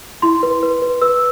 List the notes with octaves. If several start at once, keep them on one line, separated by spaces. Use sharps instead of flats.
E4 C6
B4
B4
B4
B4 E6